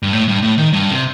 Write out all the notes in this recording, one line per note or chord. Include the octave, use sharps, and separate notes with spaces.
G2
A2
G2
A2
D#3
G2
C3